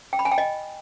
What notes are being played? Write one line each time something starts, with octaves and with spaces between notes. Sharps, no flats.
G5
B5
G#5
G5
D#5